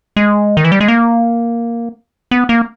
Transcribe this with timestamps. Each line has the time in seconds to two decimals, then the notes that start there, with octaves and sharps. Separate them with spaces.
0.16 G#3
0.57 D#3
0.65 E3
0.72 G3
0.81 G#3
0.88 A#3
2.31 B3
2.49 A#3